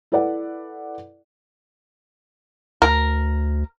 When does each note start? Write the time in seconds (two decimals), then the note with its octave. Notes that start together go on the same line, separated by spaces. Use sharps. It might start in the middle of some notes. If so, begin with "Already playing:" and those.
0.12 E4 A4 B4 D5 F#5
2.82 D2 A#4